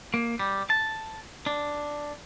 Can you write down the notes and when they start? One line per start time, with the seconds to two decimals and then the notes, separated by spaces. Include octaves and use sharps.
0.14 A#3
0.39 G3
0.70 A5
1.46 D4